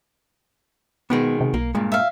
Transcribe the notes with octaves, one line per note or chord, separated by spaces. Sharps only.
B2 D#3 G#3 B3
C3
B1 A#3
G2 A#2 G#3
E5 F5